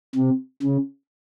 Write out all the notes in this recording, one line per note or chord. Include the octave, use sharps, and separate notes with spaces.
C3
C#3